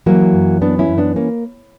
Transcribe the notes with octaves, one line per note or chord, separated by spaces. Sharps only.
E3 F#3 A#3
F#2
E3 B3 D4
C#4 E4
F#2
B3 D4
A#3 C#4